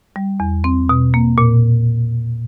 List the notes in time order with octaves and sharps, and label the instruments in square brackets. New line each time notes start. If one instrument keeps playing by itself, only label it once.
[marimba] G3
E2
C4
B2
A#3
A#2